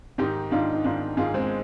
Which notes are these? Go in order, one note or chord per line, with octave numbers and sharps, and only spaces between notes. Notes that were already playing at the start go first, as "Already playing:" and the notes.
G#2 D#3 D#4 G4
G#2 D#3 D4 F4
D#4
G#2 D#3 D4 F4
G#2 D#3 F4 G#4
G#3 C4